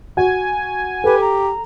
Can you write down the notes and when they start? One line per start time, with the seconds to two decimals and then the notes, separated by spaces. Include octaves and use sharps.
0.17 F#4 G#5
1.04 G4 A4 B4
1.21 A#5